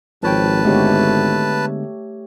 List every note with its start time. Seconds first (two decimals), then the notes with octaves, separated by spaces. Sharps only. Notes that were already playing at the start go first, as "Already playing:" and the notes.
0.23 G#1 F3 B4 C#5 G5 A5
0.65 D3 G#3 A3 B3 G4 C#5